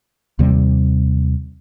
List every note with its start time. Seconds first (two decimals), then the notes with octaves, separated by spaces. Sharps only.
0.39 D#2 C3 G3